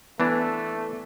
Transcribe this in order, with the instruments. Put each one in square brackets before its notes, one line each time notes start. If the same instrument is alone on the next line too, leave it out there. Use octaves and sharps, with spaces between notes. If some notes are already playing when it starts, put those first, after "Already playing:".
[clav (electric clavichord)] E3 D4 [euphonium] A3 [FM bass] B3